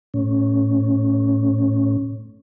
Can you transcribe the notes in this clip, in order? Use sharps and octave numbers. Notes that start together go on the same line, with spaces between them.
A2 C#4